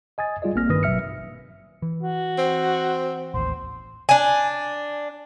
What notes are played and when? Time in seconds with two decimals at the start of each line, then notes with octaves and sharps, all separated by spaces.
0.18 D#5 G#5 D#6 A6
0.42 G3 F4 G#4 D5 D#5
0.55 A1 A#3 C4 F6 A#6
0.69 G2 D#3 B4 D#6 A#6
0.83 G#1 B2 F#3 E5 F6 C#7
1.82 E3
2.03 F#4
2.38 C4
3.34 A1 D#2 C5
4.09 D4 G#5